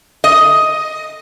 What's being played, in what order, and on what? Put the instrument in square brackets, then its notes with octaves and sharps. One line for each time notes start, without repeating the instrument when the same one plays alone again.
[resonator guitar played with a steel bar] D#5